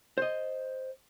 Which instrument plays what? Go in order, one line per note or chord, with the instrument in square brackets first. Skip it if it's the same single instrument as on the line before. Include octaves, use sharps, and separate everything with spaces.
[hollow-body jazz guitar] C5 D#5